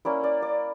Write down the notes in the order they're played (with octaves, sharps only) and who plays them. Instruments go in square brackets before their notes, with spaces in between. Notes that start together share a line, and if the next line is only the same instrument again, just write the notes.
[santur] A#3 C#4 E4 D5
D5
D5